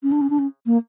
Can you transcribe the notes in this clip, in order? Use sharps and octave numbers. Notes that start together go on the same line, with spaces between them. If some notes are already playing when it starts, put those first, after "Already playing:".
C#4
D4
C#4
D4
C#4
A#3